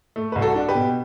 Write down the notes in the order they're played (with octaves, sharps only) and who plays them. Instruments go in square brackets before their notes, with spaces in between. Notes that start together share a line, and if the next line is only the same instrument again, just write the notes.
[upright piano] A3
C2 B4
F#4 A4
D4
G4 B4
B2